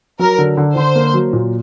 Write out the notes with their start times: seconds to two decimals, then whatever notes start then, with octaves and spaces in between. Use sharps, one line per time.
0.19 F#3 A#4
0.38 D3
0.57 D3
0.76 D3 C5
0.95 A#3
1.14 F#3
1.33 A#2